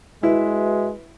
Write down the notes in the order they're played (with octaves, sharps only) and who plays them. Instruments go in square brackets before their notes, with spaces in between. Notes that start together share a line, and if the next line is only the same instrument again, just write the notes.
[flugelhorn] G#3 [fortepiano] E4 [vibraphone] F#4 B4 E5